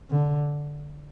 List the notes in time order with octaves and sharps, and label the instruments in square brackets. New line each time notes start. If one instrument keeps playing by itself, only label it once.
[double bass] D3